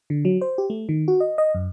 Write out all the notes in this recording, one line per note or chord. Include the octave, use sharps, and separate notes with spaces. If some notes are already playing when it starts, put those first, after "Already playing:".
D3
F#3
C5
G4
A3
D#3
F#4
D#5
D#5
F#2